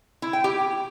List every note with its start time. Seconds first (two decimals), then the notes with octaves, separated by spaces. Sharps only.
0.22 E4
0.33 G5
0.44 G4